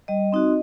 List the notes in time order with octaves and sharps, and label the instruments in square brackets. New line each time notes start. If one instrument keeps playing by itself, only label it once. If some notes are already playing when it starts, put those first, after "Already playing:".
[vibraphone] G3 D#5
C4 D#4 F#4